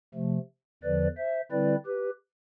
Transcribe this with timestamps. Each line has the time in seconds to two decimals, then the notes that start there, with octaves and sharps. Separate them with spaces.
0.14 C3 F3 A3
0.83 E2 D3 F3 B4 D5
1.17 C5 E5
1.51 D3 G3 C4 E4 B4 D5
1.86 G4 B4